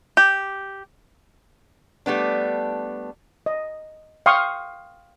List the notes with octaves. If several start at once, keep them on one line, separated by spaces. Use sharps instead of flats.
G4
G3 A3 B3 D4
D#5
F5 G5 C6 C#6 D#6